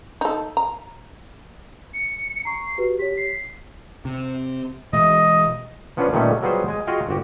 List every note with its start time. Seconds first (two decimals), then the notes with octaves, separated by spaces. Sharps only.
0.21 D#4 A4
0.57 A#5
1.94 C#7
2.45 A#5 C#6 C7
2.78 F#4 G4 B4
2.99 G4 C#5 B6
3.17 C7
4.05 C3
4.93 B2 E3 G#3 D#5
5.97 F3 B3 C#4 D4 F4 B4
6.13 A#2 D#3 G3 A3 B3 C#4
6.42 F#3 G3 B3 F4 G#4 C5
6.68 G#3 G#5
6.87 F4 F#4 G#4 D#5 F5 G5
7.09 G1 F#4 G4